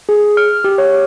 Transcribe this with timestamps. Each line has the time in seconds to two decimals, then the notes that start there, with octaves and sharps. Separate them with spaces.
0.09 G#4
0.37 F6
0.64 G4
0.78 C#5